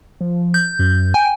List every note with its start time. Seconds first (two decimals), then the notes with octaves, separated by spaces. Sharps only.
0.21 F3
0.54 G6
0.79 F#2
1.14 G5 G#5